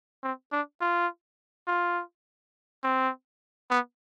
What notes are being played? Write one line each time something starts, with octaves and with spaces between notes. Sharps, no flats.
C4
D4
F4
F4
C4
B3